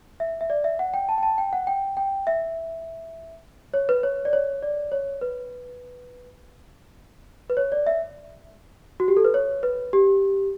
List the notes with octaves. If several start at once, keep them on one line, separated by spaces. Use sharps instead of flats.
E5
E5
D5
E5
F#5
G5
A5
G5
A5
G5
F#5
G5
G5
E5
C#5
B4
C#5
D5
C#5
D5
C#5
B4
B4
C#5
D5
E5
F#4
G4
A4
B4
C#5
B4
G4